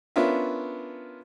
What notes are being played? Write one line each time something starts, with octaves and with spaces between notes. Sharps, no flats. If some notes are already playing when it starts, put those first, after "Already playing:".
B3 C#4 D4 F4 A#4 E5